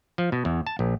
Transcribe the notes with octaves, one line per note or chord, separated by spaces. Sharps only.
F3
B2
E2
A5
A#1